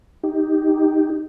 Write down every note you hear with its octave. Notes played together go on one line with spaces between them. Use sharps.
D#4 G4